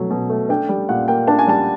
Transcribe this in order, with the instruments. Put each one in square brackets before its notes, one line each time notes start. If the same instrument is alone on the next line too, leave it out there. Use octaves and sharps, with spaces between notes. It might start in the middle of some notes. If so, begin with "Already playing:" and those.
Already playing: [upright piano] B2 F#3 A3
B2
A3
D4 G5
G3
A#2 F#5
A#3 G5
D4 A5
G#5
G3 A5